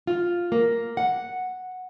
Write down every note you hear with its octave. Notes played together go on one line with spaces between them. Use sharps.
F4
A#3
F#5